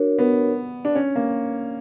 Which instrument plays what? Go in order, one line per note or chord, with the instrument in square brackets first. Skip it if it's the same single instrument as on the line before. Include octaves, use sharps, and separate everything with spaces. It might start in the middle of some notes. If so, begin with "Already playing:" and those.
Already playing: [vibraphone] D4 F#4 A#4 C#5
[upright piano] B3
D4
C#4
A#3